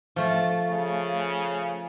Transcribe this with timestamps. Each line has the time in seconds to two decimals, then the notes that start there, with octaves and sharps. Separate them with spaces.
0.16 F3 A3
0.69 C#3